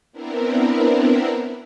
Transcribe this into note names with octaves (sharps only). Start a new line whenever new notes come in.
B3 C4 D4 E4 A#4